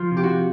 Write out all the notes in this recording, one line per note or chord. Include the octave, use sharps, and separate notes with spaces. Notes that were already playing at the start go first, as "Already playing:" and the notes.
Already playing: F3 F4
C3
G4
F#4